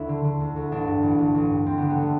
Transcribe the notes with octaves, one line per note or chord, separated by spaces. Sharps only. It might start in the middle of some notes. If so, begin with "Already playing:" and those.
Already playing: D2 E4
D3
D3
D2
D2
A1 D4
G2
A1
A1
A1
G2
D2 C4
D3 B3
B3
D3 A3